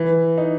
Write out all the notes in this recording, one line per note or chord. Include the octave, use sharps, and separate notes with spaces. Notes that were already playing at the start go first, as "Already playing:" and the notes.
Already playing: E3
D#4